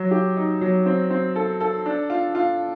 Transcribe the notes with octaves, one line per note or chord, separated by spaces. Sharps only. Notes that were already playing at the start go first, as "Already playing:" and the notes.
Already playing: F#3
G4
D#4
F#3
C4
C4
A4
A4
D4
F4
F4